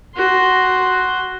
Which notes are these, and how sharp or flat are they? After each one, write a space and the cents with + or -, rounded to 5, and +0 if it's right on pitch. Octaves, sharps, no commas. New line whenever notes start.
F#4 +5 C6 +0